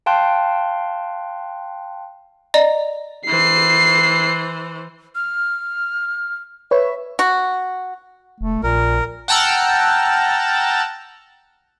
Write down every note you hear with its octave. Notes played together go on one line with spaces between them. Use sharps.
F5 G5 A5 C6 F#6
D5 D#5 A#5
E3 C5 C7
F6
B4 C#5 E5
F#4
E1 A3
A#1 A#2 A#4
F#5 G5 A5 A#5 E6 F6